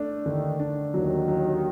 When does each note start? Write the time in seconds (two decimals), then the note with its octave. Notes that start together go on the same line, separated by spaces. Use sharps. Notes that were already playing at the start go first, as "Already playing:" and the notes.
Already playing: A3 D4
0.26 D#2 D3 D#3
0.60 D4
0.94 D#2 D#3 F#3
1.28 F#3